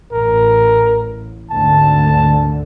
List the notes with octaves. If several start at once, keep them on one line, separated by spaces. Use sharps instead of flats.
A1 A#4
G#1 D2 D3 A5